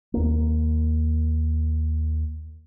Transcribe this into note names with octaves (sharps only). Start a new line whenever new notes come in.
D#2 A#3